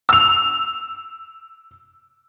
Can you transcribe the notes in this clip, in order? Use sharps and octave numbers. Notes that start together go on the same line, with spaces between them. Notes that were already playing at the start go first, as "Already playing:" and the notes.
E6 F7